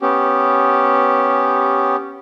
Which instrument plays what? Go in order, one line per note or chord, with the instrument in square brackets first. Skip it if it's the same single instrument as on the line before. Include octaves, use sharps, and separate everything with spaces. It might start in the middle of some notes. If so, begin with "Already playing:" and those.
[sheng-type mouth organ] B3 C#4 G4